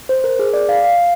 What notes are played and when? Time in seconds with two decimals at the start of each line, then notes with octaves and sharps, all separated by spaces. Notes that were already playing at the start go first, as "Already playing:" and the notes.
0.09 C5
0.24 A#4
0.39 G#4
0.54 D5
0.69 F5
0.84 F5